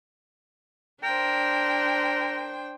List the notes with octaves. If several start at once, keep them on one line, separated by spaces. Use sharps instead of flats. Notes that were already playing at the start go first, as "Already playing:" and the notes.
D4 A#4 C5 G5